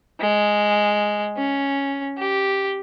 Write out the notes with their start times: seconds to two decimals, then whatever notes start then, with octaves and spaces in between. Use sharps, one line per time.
0.21 G#3
1.37 C#4
2.18 G4